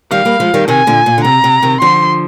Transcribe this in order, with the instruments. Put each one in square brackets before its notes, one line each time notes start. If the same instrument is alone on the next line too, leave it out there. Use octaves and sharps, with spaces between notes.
[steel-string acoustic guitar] D#3 G3 [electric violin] F5
[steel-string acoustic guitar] G3 A#3
F3 G#3
D#3 G3
[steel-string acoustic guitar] C3 D#3 [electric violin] G#5
[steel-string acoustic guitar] A#2 D3
A#2
D3
[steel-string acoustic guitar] C3 [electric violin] A#5
[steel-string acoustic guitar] C3
C3 D#3
[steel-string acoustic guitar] D3 F3 [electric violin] C6